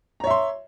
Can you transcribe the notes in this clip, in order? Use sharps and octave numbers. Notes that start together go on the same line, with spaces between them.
C#5 E5 A#5 C6